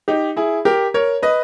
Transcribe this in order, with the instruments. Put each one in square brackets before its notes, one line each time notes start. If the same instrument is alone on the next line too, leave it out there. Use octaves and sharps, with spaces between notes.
[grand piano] D#4 G4
E4 G#4
G4 A#4
A#4 C#5
B4 D#5